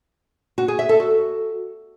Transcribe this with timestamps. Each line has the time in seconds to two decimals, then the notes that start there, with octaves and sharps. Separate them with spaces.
0.58 F#4
0.68 G#4
0.79 E5
0.89 A4
1.00 F#4